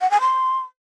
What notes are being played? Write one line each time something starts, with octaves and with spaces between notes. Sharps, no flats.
F#5
G#5
C6